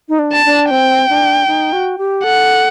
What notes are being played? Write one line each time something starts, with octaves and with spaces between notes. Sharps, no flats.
D#4
D4
A5
D4
C4 G5
D4
D#4
F#4
G4
A4 F#5